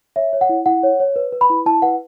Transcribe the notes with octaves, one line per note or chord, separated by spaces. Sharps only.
C#5 E5
C#5
F#5
E4
E4 F#5
C#5
C#5
B4
B4
B5
E4
E4 A5
B4 F#5